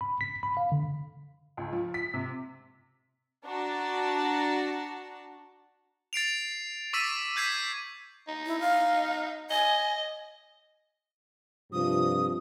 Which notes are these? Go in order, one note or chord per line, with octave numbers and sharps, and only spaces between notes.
B5
B6
B5
F5
D3
C#2
F3
B6
C3
D4 F#4 A5 A#5
A6 C7 D7 F7
C#6 D6 E6 A6 B6 D#7
E6 G6 G#6 B6 C7 D#7
D#4
E4
F5
D#5 G#5
G2 C3 F3 D#6